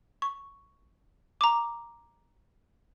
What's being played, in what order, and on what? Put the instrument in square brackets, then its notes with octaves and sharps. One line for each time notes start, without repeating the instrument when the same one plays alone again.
[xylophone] C#6
A#5 D6